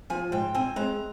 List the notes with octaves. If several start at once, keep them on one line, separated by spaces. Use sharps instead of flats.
F3 G#5
G#2 G5
C4 G#5
G#3 A#5